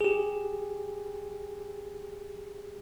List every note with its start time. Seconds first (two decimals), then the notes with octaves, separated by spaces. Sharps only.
0.01 G4 G#4